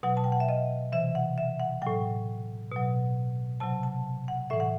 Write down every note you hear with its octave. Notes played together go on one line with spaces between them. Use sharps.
B2 F#3 F#5
A5
G5
F#5
E5
D#5
C3 E3 E5
F#5
E5
F#5
A2 F#3 G5
B2 F#3
C3 F#3 A5
A5
F#5
A2 E3 E5
F#5